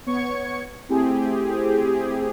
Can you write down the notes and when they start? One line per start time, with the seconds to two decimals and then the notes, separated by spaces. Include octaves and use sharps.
0.06 B3 C#5 C#6 G#6 C#7
0.89 A3 C4 E4 G4 G#4